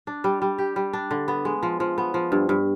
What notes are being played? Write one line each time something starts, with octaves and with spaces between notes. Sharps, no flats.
D4
G3
G3
G4
G3
D4
D3
B3
G#3
F3
F3
B3
F3
G2
G2